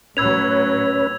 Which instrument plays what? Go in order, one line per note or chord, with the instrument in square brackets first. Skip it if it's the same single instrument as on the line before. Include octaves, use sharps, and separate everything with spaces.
[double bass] A2 F#3 [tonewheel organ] C#4 B4 [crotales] E6 G#6 F7